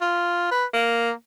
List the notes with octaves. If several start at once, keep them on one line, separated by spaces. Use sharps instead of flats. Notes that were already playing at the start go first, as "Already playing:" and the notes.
F4
B4
A#3